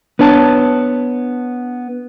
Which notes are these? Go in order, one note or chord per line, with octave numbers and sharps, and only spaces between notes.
B3 D4 C#5 A5